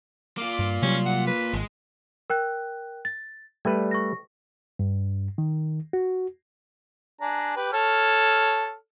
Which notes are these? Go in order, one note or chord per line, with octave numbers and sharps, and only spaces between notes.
A#3 F4 D6
G2
C3 F#3 G3 C#4
F#5
B4
G#1 G#3
A#4 G5 F#6
A6
G3 A3 B4 D5
C#6 A#6
G2
D#3
F#4
D4 G#4 A#5
G4 B4
A4 C#5 F6